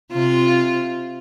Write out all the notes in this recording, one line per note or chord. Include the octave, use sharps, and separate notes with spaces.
C3 F4